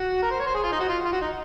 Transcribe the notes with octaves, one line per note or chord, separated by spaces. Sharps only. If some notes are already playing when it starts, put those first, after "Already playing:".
Already playing: F#4
A#4
C5
C#5
C5
G#4
F4
D#4
F#4
F4
F4
F#4
D#4